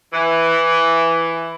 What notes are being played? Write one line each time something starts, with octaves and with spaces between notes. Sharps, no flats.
E3